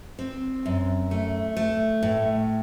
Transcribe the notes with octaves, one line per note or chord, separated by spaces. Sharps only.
C4
F#2
A3
A3
A2